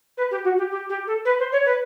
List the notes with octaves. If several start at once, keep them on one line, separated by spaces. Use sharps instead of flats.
B4
G4
F#4
G4
G4
G4
A4
B4
C5
C#5
B4